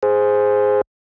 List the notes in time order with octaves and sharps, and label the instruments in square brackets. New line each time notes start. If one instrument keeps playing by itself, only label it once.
[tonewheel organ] G#4 C5